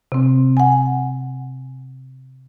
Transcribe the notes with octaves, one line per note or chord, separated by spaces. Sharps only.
C3 C4
F#5 G#5